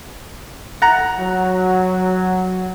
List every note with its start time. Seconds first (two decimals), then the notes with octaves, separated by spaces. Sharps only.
0.82 F#5 A#5
1.17 F#3